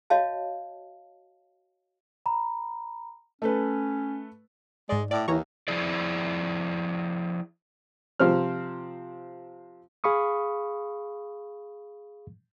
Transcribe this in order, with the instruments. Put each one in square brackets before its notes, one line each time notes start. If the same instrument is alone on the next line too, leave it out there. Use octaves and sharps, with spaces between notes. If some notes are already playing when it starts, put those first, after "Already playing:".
[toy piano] F#4 C#5 D#5 F5 A5
[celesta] A#5 B5
[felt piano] A3 A4 B4 [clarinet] C#4
[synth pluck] G#2 D5 [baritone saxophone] G#3
[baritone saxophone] A2 [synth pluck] D5 D6
[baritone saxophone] D#2 [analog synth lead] E3 [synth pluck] C#5 A#5 C#6
[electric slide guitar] F3 E4 G#4 D5
[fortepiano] C3 F3 C4 F6
[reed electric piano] G#4 F5 B5 C#6 D#6